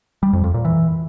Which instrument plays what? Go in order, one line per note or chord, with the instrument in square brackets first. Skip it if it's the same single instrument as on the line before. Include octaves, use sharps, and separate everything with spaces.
[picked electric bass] G3
F2
F2
A#2
E3